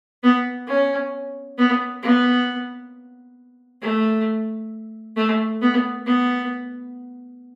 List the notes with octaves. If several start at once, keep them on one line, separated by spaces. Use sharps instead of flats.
B3
C#4
B3
B3
A3
A3
B3
B3